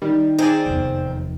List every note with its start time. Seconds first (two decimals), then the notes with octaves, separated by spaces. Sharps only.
0.02 D#3 G3
0.39 C4 D#4 G#4 C5 D5
0.66 F1 E2